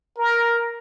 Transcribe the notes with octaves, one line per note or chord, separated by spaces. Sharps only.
A#4